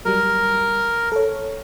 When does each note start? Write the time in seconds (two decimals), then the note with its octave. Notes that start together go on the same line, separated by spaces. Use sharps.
0.05 F#3 G3 A#4
1.12 A4 C#5